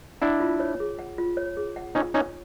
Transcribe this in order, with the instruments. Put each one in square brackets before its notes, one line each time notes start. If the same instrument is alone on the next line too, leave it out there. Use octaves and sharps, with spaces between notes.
[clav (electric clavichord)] D4 E4 [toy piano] F#5
[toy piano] F4
C#5
G#4
F#5
F4
C#5
G#4
F#5
[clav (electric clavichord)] C#4 D#4 [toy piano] F4
[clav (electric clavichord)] C#4 D#4 [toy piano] C#5